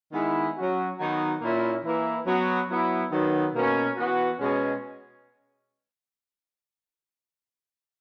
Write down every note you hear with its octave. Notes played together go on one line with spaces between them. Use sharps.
D#3 G#3 B3 E4
F#3 C#4 F#4
D#3 F#3 B3 D#4 F#4
A#2 A#3 C#4 E4
E3 A#3 E4
F#3 B3 F#4
F#3 B3 E4
D#3 F#3 B3
B2 A#3 C#4
E3 B3 F#4
B2 G#3 C#4